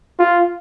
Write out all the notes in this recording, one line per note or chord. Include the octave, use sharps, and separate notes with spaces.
F4